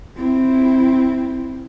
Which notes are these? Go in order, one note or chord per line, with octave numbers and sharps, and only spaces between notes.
C4 E4